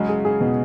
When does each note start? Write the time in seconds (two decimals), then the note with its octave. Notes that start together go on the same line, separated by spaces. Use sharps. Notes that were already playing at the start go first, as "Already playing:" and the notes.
Already playing: C#3 F#3 G#3
0.09 G#4
0.25 G#4
0.41 B2